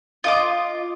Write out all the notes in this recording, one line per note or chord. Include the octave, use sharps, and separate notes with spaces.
F4 D#5 D6